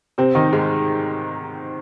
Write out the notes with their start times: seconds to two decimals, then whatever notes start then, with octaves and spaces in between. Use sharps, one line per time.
0.18 C3 C4
0.35 D#3 D#4
0.53 G#2 G#3